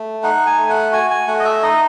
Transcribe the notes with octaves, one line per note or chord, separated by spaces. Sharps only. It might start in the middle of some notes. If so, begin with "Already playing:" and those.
Already playing: A3
D#4 F#5
G#5
A3
F#5
F#4 G#5
G#5
A3 F#5
D#5
E5
D#4 D#5